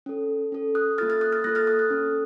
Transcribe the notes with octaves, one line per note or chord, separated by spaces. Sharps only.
C#4 A4
C#4 A4
D#6 F#6
A#3 F4 A4 F6 A6
F6 A6
D#6 F#6
F6 A6
A#3 F4 A4 F#6 A#6
F6 A6
D#6 F#6
D#6 F#6
C#4 A4